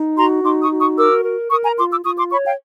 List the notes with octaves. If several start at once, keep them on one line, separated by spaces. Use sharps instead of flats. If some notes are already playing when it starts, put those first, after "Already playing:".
Already playing: D#4
F#4 A#5 C6
D#4 C6 D6
C#6 D#6
F#4
C#6 D#6
A#4 D6 E6
A#4
A#4 C#6 D#6
G#5 A#5
F4 C6 D6
D6 E6
F4 C#6 D#6
C6 D6
C#5 B5 C#6
F5 G5